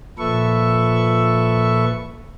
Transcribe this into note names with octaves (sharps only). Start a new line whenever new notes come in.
A#2 F3 A4 B4 E5 C#6